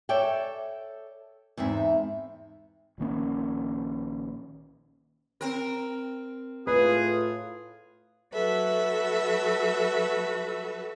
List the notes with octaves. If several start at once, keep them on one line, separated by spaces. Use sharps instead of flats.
A4 C#5 D5 E5 G5
E2 G#2 C4 E5
A#1 D#3 A#3 C#4
C4 A#4
A2 F4 G#4 B4
F#3 F#4 A4 B4 E5